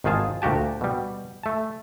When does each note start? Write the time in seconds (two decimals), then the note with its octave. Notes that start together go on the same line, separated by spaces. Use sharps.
0.04 G#1 D#3 F4 G#4 A5
0.42 D2 A#2 F#4 G4 A5
0.81 B2 G3
1.43 A3 A5